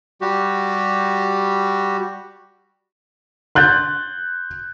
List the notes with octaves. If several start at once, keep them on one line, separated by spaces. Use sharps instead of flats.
G3 F#4 G4
C6 F#6 G6 A6